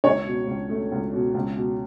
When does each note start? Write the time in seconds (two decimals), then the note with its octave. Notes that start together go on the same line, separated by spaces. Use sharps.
0.04 C#2 C#5
0.26 B2
0.47 C#2
0.70 A3
0.92 C#2
1.13 B2
1.34 C#2
1.56 B2